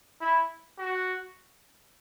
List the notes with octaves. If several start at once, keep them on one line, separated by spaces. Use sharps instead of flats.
E4
F#4